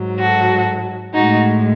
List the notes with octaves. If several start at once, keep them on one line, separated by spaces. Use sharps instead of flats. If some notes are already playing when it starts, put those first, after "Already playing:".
Already playing: G#2 F#3
F#4 A4
A2 G#3 D#4 F#4